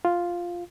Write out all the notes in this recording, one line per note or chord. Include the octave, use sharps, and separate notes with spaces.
F4